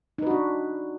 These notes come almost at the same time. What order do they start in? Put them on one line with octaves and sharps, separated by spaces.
D#4 B4 F#4 D4